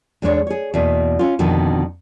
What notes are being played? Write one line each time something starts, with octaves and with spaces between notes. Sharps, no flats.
E2 G#3 D4 C5 C#5
G#4 C#5
E2 B2 A#3
C#4 F4
F2 B2 D3 D#3 B3 C4